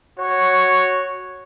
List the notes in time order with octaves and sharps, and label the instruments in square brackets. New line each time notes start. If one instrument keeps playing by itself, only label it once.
[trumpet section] F#4 C#5